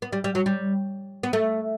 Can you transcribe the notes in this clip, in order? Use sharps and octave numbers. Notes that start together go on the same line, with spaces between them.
B3
G3
G3
F#3
G3
B3
A3